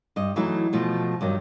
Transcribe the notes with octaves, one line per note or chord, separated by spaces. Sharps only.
G2 D#5
E3 F#3 A3 D#4 E4
B2 F3 A3
G2 D#3 F#3